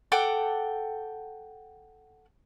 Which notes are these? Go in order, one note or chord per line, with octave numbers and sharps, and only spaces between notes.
A4 F#5 G5 D6